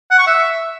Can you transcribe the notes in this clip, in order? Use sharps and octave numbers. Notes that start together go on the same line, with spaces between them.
F#5
C#6
E5